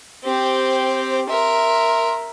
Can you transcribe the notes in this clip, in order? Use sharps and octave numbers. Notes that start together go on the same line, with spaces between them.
C4 G4 C5
A#4 E5 C6